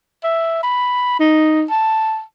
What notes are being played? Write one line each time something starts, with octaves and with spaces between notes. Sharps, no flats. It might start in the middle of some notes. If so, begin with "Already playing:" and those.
E5
B5
D#4
A5